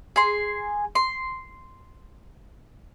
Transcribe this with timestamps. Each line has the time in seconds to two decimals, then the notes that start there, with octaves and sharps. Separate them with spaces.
0.16 G#4 C6
0.95 C6